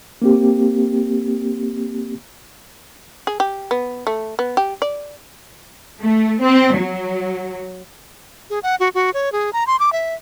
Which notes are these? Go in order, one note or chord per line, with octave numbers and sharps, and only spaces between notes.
A#3 C4 G4
G#4
G4
B3
A3
B3
G4
D5
A3
C4
F#3
G#4
F#5
F#4
F#4
C#5
G#4
A#5
C6
D6
E5